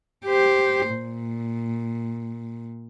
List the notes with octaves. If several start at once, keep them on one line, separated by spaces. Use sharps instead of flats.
G4 C5
A#2